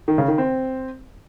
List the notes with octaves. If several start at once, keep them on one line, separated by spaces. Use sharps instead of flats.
D#3
C#3
D#3
C4